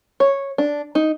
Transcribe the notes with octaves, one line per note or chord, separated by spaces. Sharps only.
C#5
D4
D#4